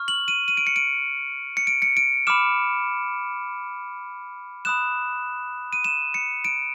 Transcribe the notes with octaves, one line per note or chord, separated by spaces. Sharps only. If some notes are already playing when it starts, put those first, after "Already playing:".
Already playing: C#6 F6
F#7
D#7
D#7
D7
C#7
D7
C#7
D7
C#7
D7
B5 D6 F6 E7
B5 D#6 F#6 E7
D#7
E7
C#7
D7